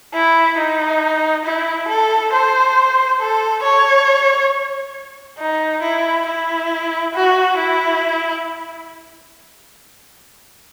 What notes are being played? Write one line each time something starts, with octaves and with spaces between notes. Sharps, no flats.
E4
D#4
E4
A4
C5
A4
C#5
D#4
E4
E4
F#4
E4